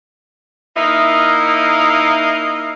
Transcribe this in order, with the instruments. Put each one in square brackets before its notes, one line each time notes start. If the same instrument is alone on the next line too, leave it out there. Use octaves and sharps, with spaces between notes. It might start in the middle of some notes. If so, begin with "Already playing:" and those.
[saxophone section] A#3 D#4 E4 D#5 F5